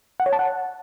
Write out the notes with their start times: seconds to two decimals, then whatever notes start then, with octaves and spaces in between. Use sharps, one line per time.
0.20 F#5
0.26 C#5
0.33 A5
0.39 F#5